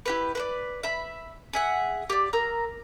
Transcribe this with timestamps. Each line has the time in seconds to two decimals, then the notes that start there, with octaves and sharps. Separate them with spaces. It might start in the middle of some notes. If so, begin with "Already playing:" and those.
0.06 E4 G4 B4
0.35 B4 C5 D5
0.83 E5 B5
1.53 G#4 E5 F#5
2.10 G4 D5
2.33 A#4 A#5 E6